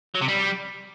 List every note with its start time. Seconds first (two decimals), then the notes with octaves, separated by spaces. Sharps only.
0.15 F#3
0.22 C3
0.29 G3